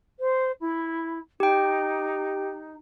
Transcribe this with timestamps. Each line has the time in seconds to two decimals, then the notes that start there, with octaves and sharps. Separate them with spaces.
0.20 C5
0.61 E4
1.40 D#4 G4 G5